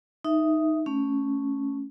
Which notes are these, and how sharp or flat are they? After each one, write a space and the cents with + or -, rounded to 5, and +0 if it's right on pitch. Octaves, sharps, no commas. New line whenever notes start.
D#4 +0 E5 +0
A3 +0 C#4 +0